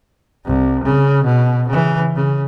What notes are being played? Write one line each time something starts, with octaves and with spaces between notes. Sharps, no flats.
C2
C#3
B2
C#3 E3
C#3